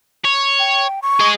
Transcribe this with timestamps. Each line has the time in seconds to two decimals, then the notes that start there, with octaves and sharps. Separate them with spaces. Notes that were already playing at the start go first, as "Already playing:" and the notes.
0.25 C#5
0.59 G5
1.02 C#6
1.20 G#4 D#5